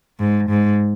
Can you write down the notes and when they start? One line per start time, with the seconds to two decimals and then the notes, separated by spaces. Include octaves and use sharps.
0.20 G#2
0.49 G#2